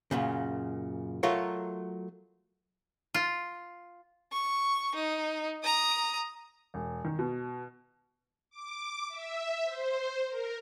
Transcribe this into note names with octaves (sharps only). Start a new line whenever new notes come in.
F#2 A#2 C#3
F#3 A3 F4 A#4 C#5
F4
C#6
D#4
A#5 D#6
E1
D#3
B2
D6
E5
C5
A#4